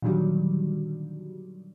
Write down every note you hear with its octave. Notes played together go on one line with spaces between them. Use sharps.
A#2 D3 D#3 F#3 G3